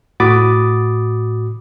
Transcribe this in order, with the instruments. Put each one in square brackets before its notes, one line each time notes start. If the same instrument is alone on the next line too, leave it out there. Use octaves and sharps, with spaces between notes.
[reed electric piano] A2 F#4 B5 D6 D#6 A6